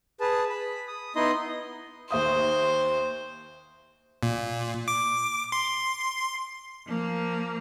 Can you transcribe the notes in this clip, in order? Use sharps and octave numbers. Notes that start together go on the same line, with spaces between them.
G#4 B4 A5
B5
D#6
B3 D#4 E4 D#5 C6 D#6
D#2 C5 E5 D#6
A#2
D6
C6
F3 A#3